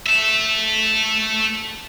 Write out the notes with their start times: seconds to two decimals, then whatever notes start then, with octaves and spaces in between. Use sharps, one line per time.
0.06 A3 E5